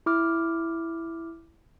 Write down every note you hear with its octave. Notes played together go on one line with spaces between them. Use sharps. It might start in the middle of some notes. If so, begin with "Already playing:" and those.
E4 D6 F6